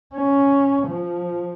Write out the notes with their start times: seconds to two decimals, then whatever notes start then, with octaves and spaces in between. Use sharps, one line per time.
0.15 C#4
0.87 F3